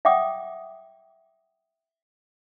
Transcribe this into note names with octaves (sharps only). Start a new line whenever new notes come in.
E5 F#5 G5 D6 D#6